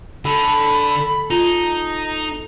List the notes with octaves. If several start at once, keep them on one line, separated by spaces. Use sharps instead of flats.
D3 A4 B5
D#4 F4 A#5